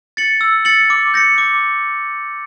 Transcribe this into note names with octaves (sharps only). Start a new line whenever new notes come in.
A6 C#7 F#7
E6
A6 C#7 F#7
D6
G6 A#6 C#7
D6